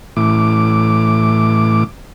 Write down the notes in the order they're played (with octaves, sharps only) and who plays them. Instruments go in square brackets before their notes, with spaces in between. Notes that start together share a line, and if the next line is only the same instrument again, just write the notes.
[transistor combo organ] A2 E3 D6